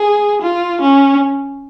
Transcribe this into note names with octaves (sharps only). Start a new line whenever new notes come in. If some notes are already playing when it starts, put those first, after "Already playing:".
Already playing: G#4
F4
C#4